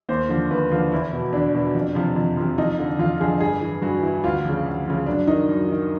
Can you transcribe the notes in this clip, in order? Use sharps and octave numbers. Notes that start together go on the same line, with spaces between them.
D#2 C5
D3 F3
D#2 B4
D3 F3 F4
E2 E4
B2
E2 D4
B2
F2
C3 F3
F2
C3 F3
F2 D#4
D3 F3
F2 F4
D3 F3 G#4
G2 G#4
E3
G2 F#4
E3 E4
D2 F4
C#3 F3
D2
C#3 F3
F#2 D4
D#3 D#4
F#2
D#3